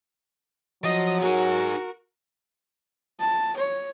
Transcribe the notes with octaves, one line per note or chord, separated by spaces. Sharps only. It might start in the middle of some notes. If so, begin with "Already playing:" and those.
F3 F#3 D#5 D#6
D#4 F#4 G#4 A#4
A5
C#5